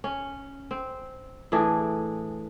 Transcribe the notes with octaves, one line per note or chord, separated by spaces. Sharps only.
C#4
C4
A2 E3 D4 G#4